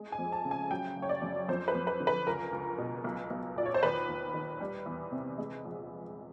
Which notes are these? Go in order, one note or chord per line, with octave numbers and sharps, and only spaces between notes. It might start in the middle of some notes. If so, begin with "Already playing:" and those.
Already playing: G#3
G#5
F2
A5
C#3
G#5
F#3 G5
F#1
C#5
D5
F#2
F2 C5
B4
F2
B4
D3
B4
C#2 A#4
C#2
B2
B1
B1
A#2 D5
C#5
C5
D#2 B4
D#2
D#3
G3
E2
C3
G#3
A#1